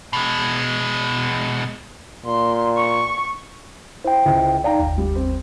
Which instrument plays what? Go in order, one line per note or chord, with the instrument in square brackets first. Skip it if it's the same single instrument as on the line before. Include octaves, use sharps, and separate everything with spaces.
[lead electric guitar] B2 G#3
[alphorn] A#2 [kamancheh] C6
[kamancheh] C#6
[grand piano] E4 [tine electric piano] C5 G5
[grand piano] C#2 E4
[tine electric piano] D#4 D5 [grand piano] F5 G5 A#5
[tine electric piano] G1 D#2
[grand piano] G3
C4